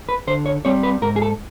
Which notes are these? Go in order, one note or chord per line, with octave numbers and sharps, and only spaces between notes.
B4
D3 C5
C#5
G3 C4 C#5
B4
G#2 A#4
G#4
A4